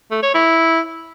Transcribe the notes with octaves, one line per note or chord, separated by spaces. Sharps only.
A3
C#5
E4